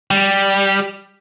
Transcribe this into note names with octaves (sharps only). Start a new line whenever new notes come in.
G3